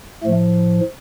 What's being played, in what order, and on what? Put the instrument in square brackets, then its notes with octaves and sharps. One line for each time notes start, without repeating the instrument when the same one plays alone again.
[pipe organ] A2 F3 A3